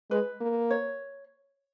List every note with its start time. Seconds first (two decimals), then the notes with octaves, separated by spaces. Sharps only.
0.11 G#3 B4
0.41 A#3
0.70 C#5